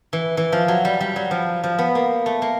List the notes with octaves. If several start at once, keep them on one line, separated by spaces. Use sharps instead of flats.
E3
E3
F3
F#3
G3
G3
F#3
F3
F3
B3
A#3
A3
A#3